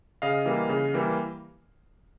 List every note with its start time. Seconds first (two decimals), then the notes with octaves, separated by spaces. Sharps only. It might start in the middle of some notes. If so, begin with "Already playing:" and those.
0.22 C#3 D#5 F5
0.45 E3 G3 A#3
0.69 C#3
0.94 E3 G3 A#3